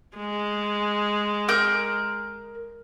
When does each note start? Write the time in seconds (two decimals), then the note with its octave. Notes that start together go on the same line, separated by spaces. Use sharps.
0.16 G#3
1.49 A#4 G6